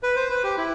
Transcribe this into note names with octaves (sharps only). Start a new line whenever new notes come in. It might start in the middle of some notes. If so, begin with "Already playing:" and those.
B4
C5
B4
G4
E4